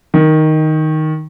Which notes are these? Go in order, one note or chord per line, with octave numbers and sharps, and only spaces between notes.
D#3